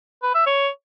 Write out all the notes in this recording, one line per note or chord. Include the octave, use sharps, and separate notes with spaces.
B4
E5
C#5